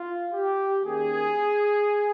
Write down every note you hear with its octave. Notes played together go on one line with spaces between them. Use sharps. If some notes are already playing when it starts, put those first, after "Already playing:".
Already playing: F4
G4
D#3 A#3 C#4 G#4